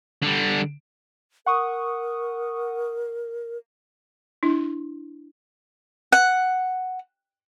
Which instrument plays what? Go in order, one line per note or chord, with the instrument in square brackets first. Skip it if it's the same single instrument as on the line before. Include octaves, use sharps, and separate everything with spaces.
[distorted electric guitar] D3 G3
[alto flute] A#4 [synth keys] F#5 C#6 D#6
[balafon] D4 E4
[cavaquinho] F#5